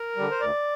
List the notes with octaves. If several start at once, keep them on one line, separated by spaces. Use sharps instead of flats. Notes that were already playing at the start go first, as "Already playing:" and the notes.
Already playing: A#4
D3 G3
C5
D2 D5